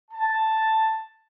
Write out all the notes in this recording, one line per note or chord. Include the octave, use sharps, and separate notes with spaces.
A5